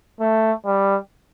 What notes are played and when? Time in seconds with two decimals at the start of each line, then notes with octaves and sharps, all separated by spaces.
0.20 A3
0.66 G3